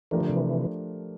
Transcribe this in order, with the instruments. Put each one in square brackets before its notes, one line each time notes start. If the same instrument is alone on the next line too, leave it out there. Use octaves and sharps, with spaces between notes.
[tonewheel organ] E3 [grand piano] F3 A3 D4 G4 A#4
[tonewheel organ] D3
C3 E3